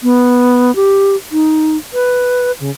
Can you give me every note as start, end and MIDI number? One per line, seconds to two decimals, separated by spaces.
0.03 0.74 59
0.76 1.16 67
1.32 1.77 63
1.93 2.52 71
2.60 2.71 49